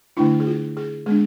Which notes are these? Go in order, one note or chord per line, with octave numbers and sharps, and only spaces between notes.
D3 A3 D4 E4
G#4
F4
G#4
G#3 B3 D4 G#4